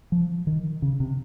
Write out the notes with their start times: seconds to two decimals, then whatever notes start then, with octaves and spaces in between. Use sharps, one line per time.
0.12 F3
0.47 D#3
0.82 C#3
1.00 C3